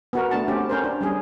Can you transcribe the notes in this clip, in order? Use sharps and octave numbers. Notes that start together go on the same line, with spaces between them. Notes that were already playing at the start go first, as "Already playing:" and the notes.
B3 F#4 A#4
A3 B3 D4 A5
C4 C#4 G4
C#4 A#4 C5
D4
G3 C#4 G#4